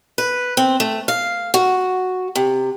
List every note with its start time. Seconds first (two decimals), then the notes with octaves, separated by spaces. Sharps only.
0.18 B4
0.57 C4
0.80 A3
1.08 F5
1.54 F#4
2.35 C3